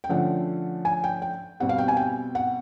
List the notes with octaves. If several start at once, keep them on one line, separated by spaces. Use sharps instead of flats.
G5
D3 F3 A3 C#4 F#5
G#5
G5
G5
B2 G3 C4 F#5
F5
G5
G#5
G5
F#5